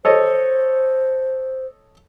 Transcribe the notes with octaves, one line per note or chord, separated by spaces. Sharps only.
A4 C5 C#5 D#5